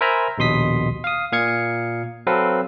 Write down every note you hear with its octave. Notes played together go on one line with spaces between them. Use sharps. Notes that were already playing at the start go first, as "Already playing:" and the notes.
A#4 C5 E5 G#5 A#5 B5
A#1 D#2 B2 C6 D#6 B6
F5 D#6
A#2 F5 D#6 G#6 C#7
F#3 C4 A4 B4 F5